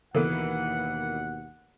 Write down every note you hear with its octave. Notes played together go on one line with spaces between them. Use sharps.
D#2 B2 E3 A#3 B3 F#5